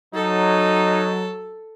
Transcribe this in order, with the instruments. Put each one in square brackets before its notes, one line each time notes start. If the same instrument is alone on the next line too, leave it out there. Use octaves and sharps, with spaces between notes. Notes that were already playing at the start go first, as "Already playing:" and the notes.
[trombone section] F#3 [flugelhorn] D#4 [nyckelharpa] A4